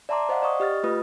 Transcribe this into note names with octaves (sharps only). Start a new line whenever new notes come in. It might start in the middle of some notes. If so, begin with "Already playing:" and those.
D5 E5 A5 A#5 C6 D6
C5 D#5 F5 F#5
D5 D#5 C#6 D#6
G4 D#5 F6 A6
A3 F4 B4 D#6